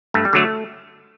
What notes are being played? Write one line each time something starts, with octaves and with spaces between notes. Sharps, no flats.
G2 A3
G3
D3 F#3 A3